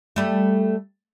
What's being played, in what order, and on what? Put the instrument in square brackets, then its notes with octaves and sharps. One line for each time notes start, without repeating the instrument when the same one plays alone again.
[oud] G3 A3